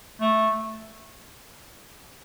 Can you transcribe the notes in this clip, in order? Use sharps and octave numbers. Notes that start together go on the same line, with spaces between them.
A3